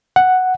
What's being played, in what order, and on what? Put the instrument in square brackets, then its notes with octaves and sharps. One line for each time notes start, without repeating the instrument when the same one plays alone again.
[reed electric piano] F#5